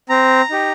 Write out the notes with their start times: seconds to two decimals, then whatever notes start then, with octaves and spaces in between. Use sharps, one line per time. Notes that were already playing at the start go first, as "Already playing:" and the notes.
0.09 C4 A#5
0.50 D#4 G4